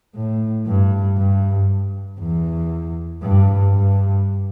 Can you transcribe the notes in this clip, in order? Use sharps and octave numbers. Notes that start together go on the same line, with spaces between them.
A2
G2
G2
E2
G2
G2